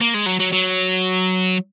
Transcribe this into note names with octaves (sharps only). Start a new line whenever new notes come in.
A#3
G#3
F#3
F#3
F#3